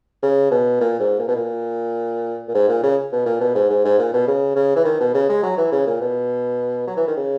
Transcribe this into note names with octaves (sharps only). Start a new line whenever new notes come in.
C#3
B2
A#2
G#2
A#2
B2
A#2
A#2
G#2
A#2
C#3
B2
A#2
B2
G#2
G#2
G#2
A#2
B2
C#3
C#3
E3
D#3
B2
C#3
G#3
F#3
E3
C#3
A#2
B2
F#3
E3
D#3
C#3